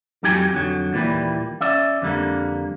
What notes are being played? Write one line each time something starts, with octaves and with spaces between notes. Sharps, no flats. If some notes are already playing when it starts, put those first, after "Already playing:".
F2 F#3 D#4 G4 G5 G#5
F2 D3 F#3
D#2 A#2 E3 G3
C#4 D5 E5
F2 D3 G3 A#3